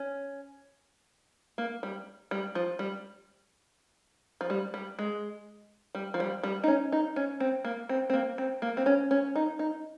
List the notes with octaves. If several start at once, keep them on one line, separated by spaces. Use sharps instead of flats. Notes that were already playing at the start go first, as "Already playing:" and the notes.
Already playing: C#4
A#3
G3
G3
F3
G3
F3
G3
G3
G#3
G3
F3
G3
G3
D#4
C#4
D#4
C#4
C4
A#3
C4
C4
A#3
C4
A#3
C4
C#4
C#4
D#4
D#4